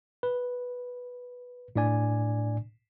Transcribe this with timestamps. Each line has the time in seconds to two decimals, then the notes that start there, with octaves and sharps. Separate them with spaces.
0.23 B4
1.76 A2 D4 D5 G#5